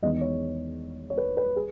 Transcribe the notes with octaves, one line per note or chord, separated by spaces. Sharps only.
E2 D#3 G#3 B3 D#5
C#5
C#5
B4
B4
G#4